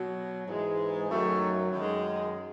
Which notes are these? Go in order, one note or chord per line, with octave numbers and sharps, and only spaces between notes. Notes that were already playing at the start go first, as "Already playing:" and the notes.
Already playing: B2 F#3
G#2 E3 G#3
F#2 D#3 F#3 A3
F#2 D#3 G#3